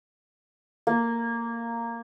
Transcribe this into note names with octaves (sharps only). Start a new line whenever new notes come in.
A#3